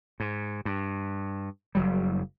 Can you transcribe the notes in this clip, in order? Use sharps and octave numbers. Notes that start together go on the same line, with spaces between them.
G#2
G2
F#1 F#3 G3